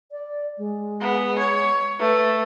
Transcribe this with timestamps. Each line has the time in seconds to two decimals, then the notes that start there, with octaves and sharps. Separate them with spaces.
0.11 D5
0.57 G#3
1.01 B3
1.38 C#5
2.00 A3 B4